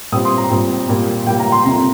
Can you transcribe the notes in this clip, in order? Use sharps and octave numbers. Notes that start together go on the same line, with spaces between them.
A#2 G3 C4 D#6
C6
A#5
A#2 G3 C4
A#2 G3 A#3
A#2 G3 A#3 G5
A#5
C6
F2 C3 F3 A#5